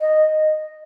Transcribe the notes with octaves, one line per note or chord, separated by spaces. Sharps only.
D#5